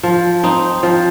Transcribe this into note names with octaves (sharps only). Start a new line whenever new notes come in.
F3
C4 D#4
F3